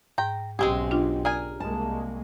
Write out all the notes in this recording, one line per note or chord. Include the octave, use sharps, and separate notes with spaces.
G#2 G5 A#5
B1 G#3 C4 C#4 G4 G#4
D4 F4
G#4 A#4 D5 G#5
C2 G#3 A#3 A5